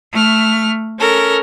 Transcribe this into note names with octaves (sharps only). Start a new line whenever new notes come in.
A3 F6
C#4 A4 A#4